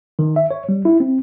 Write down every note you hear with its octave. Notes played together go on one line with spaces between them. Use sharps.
D#3
E5
C#5
G3
E4
C4